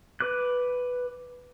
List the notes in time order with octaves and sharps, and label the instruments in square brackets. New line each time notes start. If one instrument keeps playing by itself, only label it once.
[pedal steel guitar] B4 D6 F#6